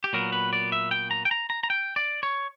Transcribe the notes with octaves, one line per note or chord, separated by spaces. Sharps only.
G4
A#2 F#3 B3 A#4
B4
D5
E5
G5
A#5
G5
A#5
A#5
A#5
G5
D5
C#5